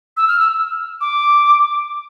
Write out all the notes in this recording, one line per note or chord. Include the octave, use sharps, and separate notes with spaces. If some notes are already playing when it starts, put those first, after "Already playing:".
E6
F6
E6
D6